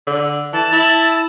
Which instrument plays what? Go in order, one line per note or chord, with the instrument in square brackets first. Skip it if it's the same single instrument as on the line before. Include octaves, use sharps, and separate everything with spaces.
[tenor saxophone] D3
[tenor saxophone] E3 [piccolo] A5
[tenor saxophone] E4